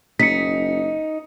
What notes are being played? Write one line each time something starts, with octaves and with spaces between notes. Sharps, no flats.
F#1 D#4 B6 C#7